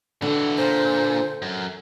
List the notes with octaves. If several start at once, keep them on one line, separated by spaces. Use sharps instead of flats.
D3 E3 F#4
A#2 C5
F#2